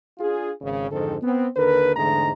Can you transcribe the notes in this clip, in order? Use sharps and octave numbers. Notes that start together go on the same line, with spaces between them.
D4 F4 G#4
G#1 C#3
F2 G#2 D3 D#3 C4 A4
B3 C4
D#2 D3 A#4 B4
E2 G#2 D3 G#3 A3 A#5